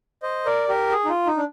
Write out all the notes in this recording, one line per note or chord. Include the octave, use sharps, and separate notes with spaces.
C5 D#5
A#4 D5
G4 A#4
G#4
D#4
F4
D#4
D4